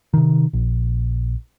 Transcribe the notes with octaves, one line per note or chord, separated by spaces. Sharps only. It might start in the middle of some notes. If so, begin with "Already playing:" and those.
C3 D#3
A#1